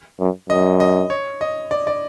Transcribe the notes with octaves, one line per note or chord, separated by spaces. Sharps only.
F#2
F#2 D#5
D#5
C#5
D#5
D5
D5